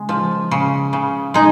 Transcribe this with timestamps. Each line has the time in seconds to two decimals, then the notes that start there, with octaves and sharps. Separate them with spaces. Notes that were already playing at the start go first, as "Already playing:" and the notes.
Already playing: C#3 G#3
0.09 F3
0.51 C#3
0.93 C#3
1.34 G#3 D#4